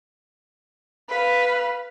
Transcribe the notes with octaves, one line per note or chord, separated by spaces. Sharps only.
B4 F5